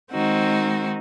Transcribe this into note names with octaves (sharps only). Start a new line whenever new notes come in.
D#3 G#3 C4 D#4 F#4